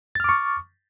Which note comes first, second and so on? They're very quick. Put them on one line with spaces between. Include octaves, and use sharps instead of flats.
A6 F6 D6 C#6